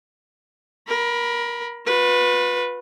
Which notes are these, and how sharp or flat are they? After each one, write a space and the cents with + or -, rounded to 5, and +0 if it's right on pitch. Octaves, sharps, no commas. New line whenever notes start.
A#4 +25 B5 +0
F4 +45 B4 +0